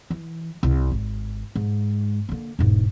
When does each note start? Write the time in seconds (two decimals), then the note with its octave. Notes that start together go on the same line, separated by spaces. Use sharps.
0.10 E3
0.63 C2 C3
0.91 G#1
1.55 G#2
2.29 D3 A#3
2.59 E1 G#2